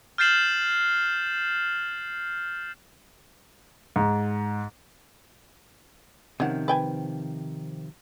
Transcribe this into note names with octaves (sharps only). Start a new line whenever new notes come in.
F6 G6 A6 C7 E7 F#7
G#2
C3 D#3 F3 C#4 F#5
B4 G5 G#5